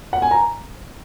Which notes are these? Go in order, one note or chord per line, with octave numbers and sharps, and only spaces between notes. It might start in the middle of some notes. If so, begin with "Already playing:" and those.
F#5
G#5
A#5